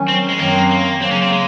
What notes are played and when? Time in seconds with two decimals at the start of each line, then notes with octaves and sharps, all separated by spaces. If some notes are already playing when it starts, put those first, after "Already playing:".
Already playing: D#3 F#3 C#4
0.08 C4
0.29 G#3
0.39 F#2 D#3 F#3 A#3 C4
0.71 A#3
1.01 C#3 F#3 A#3 C4
1.11 C#4
1.22 C4
1.32 G#3